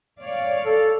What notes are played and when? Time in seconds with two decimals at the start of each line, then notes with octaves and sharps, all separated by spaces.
0.19 C#5 D5 F5
0.66 A4